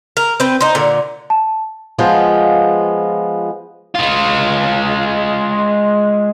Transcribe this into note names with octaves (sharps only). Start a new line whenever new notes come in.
A#4
C4 B4
D#4 C5
A#2 D3
A5
F3 G#3 B3 F4
G#3 F4